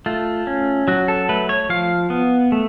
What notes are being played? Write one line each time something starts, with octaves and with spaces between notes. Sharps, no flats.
A3 F4
C#4
F#3 F#4
A4
A3 B4
C#5
F3 F5
B3
A3